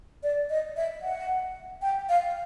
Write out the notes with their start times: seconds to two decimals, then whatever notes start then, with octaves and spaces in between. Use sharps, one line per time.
0.23 D5
0.50 D#5
0.77 E5
1.02 F#5
1.82 G5
2.09 F5